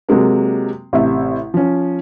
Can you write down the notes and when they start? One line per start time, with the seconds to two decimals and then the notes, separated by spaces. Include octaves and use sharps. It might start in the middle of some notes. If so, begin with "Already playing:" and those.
0.09 C3 F#3 G#3 A#3
0.93 A1 C3 E5
1.54 F3 C#4